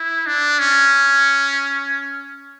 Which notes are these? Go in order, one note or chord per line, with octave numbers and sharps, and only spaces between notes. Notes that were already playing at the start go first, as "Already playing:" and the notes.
Already playing: E4
D4
C#4